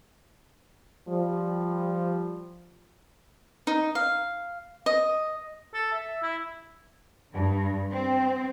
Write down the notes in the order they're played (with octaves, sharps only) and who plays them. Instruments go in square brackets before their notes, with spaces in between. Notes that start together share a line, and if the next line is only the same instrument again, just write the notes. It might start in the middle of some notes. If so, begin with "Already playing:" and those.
[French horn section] F3 G3
[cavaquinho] D#4
F5
D#5
[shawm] A4
E5
E4
[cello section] G2
C4